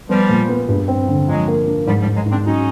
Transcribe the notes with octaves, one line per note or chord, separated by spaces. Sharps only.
F3 G3 B3
A#2
B3
G2
C4
D3
F3 F#3 G#3
A#3
D4
G#2 F3 G3
F3 G3
G#2
F#3 G#3
G#2
C4 D4
F#3 C#4 D#4